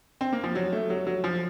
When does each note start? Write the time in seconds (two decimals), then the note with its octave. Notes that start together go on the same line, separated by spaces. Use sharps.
0.21 C4
0.33 A#3
0.44 F3
0.55 F#3
0.72 A3
0.90 F#3
1.07 F#3
1.24 F3